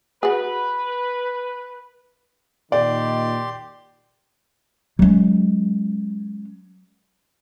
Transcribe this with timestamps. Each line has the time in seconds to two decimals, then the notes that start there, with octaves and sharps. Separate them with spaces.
0.23 F#4 G#4 B4
2.72 A#2 D#3 D#4 G4 D5 C6
4.99 F#3 G#3 C#4